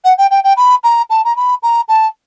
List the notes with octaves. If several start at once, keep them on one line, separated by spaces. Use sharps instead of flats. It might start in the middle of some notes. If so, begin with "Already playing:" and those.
F#5
G5
G5
G5
B5
A#5
A5
A#5
B5
A#5
A5